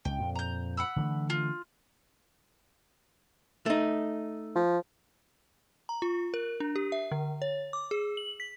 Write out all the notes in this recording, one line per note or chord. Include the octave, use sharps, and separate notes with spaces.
C#2 G5
F2 A#2
A#5 G6
F#5 B5 E6
D3 E3 A3
F4
A3 D#4
F3
A#5
F4
A#4
D4
G4
E5
D3
C#5
D6
G#4
F#7
B6